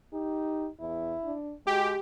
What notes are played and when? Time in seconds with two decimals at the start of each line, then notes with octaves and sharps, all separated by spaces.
0.13 D#4 G4
0.80 E2 E4
1.24 D4
1.67 G#3 F#4 G4